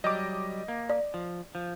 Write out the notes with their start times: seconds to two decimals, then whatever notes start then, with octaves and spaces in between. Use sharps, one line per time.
0.04 F#3 G3 D#5 D6
0.68 A#3
0.90 D5
1.14 F3
1.55 F3